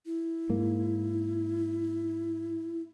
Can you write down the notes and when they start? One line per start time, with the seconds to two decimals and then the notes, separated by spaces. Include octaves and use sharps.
0.06 E4
0.49 G#2 A#3